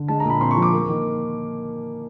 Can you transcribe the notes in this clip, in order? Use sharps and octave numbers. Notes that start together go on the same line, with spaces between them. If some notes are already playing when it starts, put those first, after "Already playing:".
Already playing: D3
G#3 A5
A#5
A#2
B5
C4 C6
C#6
F3
D6
A#3
D#3